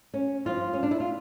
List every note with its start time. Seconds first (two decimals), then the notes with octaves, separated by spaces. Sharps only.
0.14 C#4
0.45 G2 F3 F4
0.73 C#4
0.83 D4
0.91 E4
1.00 F4